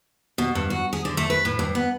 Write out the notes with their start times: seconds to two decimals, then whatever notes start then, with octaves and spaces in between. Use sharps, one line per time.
0.38 B2
0.55 G2
0.70 F#4
0.93 G#4
1.05 D3
1.17 A3
1.30 B4
1.45 A2
1.59 G2
1.75 B3